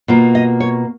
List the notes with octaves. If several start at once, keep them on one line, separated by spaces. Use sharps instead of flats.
B2 A#3 F4
D#5
C#5